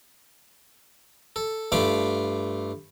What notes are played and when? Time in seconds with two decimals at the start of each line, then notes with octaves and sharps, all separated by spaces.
1.36 A4
1.72 G2 A3 F4 F5 B5 D6